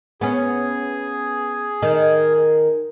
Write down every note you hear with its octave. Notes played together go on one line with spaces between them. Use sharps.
B3 C#4 G#4
D#3